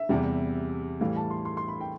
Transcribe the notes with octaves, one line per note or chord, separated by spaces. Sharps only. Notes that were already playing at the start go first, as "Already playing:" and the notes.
Already playing: E5
E2 C3 G3
A2 E3 G3 F5
A5
C6
C6
C6
B5
G5